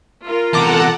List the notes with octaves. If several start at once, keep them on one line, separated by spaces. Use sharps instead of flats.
F4 A#4
E2 C3 A4 F#5 A5 A#5 D6